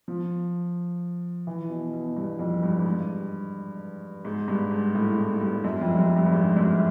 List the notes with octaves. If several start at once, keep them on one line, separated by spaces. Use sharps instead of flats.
F3
E3
B2
B2
G2
F2
G2
G#2
G2
G#2
G2
G#2
A2
A2
G2
F#2
F2
G2
F#2
G2
G2
G#2
F#2